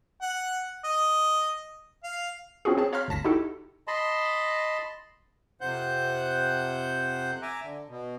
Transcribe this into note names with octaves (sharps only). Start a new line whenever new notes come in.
F#5
D#5
F5
C4 C#4 F4 F#4 G#4
C4 G#4 C#5 A5
C#5 F5 A#5 C6 F6 B6
G1 D2 A5 A#6 B6
D#4 E4 F#4 G4 A4
D#5 A5 B5 C6
F2 C3 C5 F#5 F#6 G6
E5 G#5 A#5 D6
D3
B2